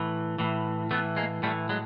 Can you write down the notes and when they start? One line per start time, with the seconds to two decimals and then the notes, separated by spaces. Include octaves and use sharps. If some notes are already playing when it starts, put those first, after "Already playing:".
Already playing: A2 E3
0.39 A2 E3
0.91 A2 E3 A3 B3
1.16 G#3 A#3
1.43 A2 G3 A3
1.46 E3
1.69 F#3 G#3